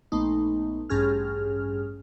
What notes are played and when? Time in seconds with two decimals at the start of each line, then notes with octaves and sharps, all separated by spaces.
0.12 A#1 A3 B3 D#4
0.90 A1 G2 C#4 G#4 F6